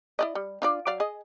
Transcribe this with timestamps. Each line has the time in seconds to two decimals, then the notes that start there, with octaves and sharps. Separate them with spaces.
0.19 E4 D5 D#5
0.35 G3
0.62 D4 F4 D5
0.87 F#3 D5 F5
1.00 G#4 D#5